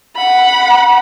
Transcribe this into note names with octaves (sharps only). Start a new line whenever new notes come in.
F#5 B5